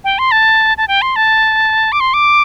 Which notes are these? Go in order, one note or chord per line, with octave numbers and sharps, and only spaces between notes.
G5
C6
A5
A5
G5
C6
A5
D6
C6
D6